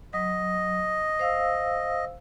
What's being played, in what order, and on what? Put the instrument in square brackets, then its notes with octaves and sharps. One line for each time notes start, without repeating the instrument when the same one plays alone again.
[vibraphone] F#3 [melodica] D#5
[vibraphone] C5 F5 E6